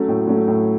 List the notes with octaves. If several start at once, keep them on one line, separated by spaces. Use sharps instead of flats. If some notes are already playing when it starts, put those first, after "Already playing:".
Already playing: F#3 A3 C#4
A2
F#3 A3 C#4
A2